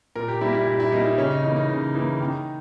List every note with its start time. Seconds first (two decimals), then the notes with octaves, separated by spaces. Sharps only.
0.15 A#2 A#4
0.28 G4
0.41 G3 A#3 E4
0.54 E4
0.67 A#2 E4
0.80 E4
0.92 G3 A#3 D#4
1.06 E4
1.18 C#3 C#4
1.31 D#4
1.44 E3 A#3 D#4
1.57 D#4
1.70 C#3
1.95 E3 A#3
2.20 D#3